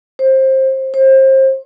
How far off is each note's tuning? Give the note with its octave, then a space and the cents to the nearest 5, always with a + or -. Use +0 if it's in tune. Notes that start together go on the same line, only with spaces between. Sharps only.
C5 +20
C5 +30